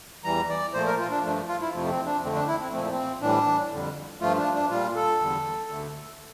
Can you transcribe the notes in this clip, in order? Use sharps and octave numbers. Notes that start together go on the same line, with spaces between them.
E2 E3 G3 A#5
D5
A#2 F3 A3 C5
A#4
F4
D4
G2 F3 A3 D4
F4
E4
F2 C3 F3 A3
C4
D4
F2 D3 A3 C4
D4
E4
C4
A#2 F3 A3 C4
C4
A2 E3 G3 D4
F2 D3 G3
G2 F3 A3 F4
D4
D4
A#2 G3 F4
A4
E2 D3 G3
D2 D3 A3